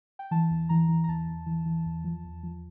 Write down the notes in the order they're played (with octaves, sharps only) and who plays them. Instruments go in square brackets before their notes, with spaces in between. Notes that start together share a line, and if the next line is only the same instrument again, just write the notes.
[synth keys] G5
E3 A5
E2
E3 A#5
E3
A#5
E2 A5
E2
E3
E3
E2
F3
E2
F3